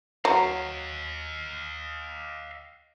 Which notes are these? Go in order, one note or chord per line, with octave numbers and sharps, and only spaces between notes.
F#3 D#5 F5